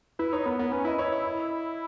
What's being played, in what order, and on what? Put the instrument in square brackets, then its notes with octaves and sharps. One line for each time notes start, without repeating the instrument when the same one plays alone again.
[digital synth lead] E4 [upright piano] B4
[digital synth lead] D#4 [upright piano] C#5
[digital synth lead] B3 [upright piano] A#4
[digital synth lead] B3 [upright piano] A#4
[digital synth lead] C#4 [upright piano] B4
[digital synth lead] E4 [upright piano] D#5
[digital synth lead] E4 [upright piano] C#5
[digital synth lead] E4
[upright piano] D#5